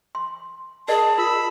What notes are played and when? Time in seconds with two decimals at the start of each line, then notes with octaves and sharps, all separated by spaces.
0.15 C6
0.88 G#4 A#4 D5 D#5 A5
1.18 F4 B5 E6